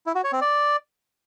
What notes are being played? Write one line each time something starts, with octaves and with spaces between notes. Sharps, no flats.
E4
F#4
C#5
C4
D5